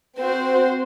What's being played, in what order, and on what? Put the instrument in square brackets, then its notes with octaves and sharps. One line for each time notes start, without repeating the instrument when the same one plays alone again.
[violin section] C4 F#4 C5